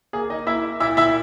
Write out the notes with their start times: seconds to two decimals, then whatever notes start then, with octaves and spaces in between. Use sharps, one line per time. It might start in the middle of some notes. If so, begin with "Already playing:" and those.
0.13 A#3 G#4
0.30 D#4 D#5
0.47 A#3 E4 E5
0.80 A#2 E4 E5
0.97 E4 E5